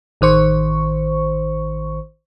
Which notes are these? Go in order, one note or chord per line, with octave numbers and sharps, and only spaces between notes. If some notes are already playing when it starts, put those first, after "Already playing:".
A1 D#3 C5 C#6